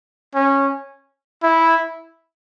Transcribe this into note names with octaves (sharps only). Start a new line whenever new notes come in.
C#4
E4